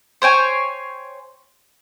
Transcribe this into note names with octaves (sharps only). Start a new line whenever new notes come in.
C5 C#5 G5 G#5